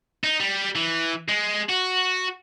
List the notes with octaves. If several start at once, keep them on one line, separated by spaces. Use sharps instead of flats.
D#4
G3
E3
G#3
F#4